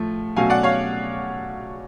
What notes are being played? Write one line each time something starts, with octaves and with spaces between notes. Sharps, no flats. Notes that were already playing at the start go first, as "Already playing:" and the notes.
Already playing: A2 F3 A3
B2 F#3 A3 C#4 F5 G#5
D5 F#5
C#5 F5